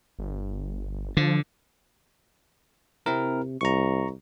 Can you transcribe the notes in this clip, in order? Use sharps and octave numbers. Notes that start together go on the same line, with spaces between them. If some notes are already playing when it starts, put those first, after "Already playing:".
G1
D3 F3
C3 C4 E4 A#4
C2 A#5 C#6